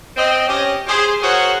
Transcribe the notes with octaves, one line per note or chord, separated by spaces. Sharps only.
C4 D#5
C#4 G4 D#5
G4 G#4 C5
F#4 G#4 A#4 C5 C#5 F#5